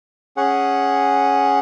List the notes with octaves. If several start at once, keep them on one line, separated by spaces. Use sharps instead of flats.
C#4 G#4 F#5